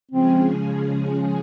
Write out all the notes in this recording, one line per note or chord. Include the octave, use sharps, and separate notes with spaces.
C#3 F3 G#3 C4 C#4 G#4